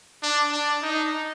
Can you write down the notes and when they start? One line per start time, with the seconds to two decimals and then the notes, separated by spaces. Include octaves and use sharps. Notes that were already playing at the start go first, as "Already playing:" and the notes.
0.23 D4
0.52 D4
0.82 D#4